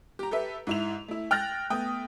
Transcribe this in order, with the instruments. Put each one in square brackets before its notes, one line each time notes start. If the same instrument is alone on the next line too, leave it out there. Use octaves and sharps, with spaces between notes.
[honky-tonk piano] G4 A#5
G4 A4 B4 E5
G#2 E4 F7
A3 E4
G5 F6 F#6 A6 A#6
A3 B3 G5 D#6